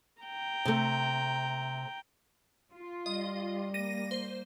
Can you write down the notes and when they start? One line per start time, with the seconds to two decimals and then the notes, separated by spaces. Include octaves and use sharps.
0.22 G5 A#5
0.65 C3 A3
2.75 F4
3.06 G3 D#5
3.74 A#3 A#6 D#7
4.11 C5